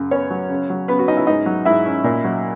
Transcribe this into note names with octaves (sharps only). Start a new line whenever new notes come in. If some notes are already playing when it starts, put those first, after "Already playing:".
Already playing: F#2 C#3
B3 C#4 C#5
F#3
C#3
F#3
C#3 B3 B4
F#4
C#4 D#4 D#5
E4 E5
G#2 D#4 D#5
F#3
G#2 E4 E5
C#4
A#2
F#3